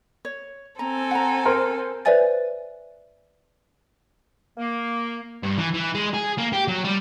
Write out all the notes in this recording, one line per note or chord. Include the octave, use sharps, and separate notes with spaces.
C#5
C4 A4 G#5 A#5
F#5 A#5
A#4 C5 C6
B4 C5 D5 E5 G#5 A6
A#3
G2
E3
E3
G#3
G#4
A#3
G4
F#3
G3